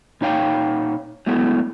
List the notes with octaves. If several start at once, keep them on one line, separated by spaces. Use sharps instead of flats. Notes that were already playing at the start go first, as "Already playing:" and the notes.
A#2 D#4 C#5 F5 G5
F#3 G#3 A3 B3 E4